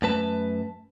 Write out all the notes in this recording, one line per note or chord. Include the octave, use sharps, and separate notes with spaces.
F#2 A3 B4 A5